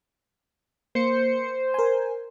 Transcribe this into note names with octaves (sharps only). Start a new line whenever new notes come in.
A#3 C5 C#7
A#4 G#5